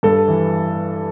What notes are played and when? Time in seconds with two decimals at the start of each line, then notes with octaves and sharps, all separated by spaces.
0.03 G2 A4
0.28 E3